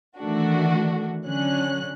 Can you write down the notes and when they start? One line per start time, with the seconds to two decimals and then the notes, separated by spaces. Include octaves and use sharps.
0.18 D#3 E3 A3 D4 F#4
1.25 D3 F#3 C#4 F#6